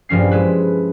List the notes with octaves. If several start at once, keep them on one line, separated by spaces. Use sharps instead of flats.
A#1 G2 F3 C#4 C7
G#3 E4 B4